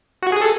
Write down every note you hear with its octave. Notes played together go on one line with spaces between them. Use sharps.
F#4
G#4
A4